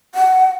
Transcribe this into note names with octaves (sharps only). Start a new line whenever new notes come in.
F#5